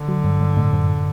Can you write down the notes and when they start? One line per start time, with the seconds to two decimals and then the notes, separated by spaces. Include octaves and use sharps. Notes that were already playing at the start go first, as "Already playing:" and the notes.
Already playing: D3
0.08 F#3
0.24 G2
0.40 G2
0.57 A2
0.73 F#2